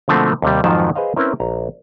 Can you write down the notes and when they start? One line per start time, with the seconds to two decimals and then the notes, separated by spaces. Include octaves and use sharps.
0.08 B2 D3 F3 A3 A#3 C4
0.42 D#2 C3 G3
0.64 F2 G#2 D#3 F3 F#3 A5
0.95 G#4 B4 C5 D#5 F5
1.16 C4 C#4 E4 A#4 B4
1.40 A#1 A#5